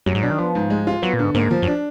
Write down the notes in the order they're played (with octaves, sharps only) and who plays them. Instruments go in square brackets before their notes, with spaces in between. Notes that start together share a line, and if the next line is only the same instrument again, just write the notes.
[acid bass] F#2 [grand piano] F#3
[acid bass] G#2
[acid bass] B2 [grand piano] D4
[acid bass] D#3
[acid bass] F3 [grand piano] B3
[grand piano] G#2
G#3
F4
[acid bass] F#3 [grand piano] B3
[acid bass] A#2
[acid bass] G#2 [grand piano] D3
[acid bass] G#2 [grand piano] A#3
[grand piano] F3
[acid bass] F#2
[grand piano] D4